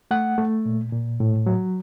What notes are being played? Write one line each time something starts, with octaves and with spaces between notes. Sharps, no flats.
A3 F#5
A3
A#2
A#2
A2
F#3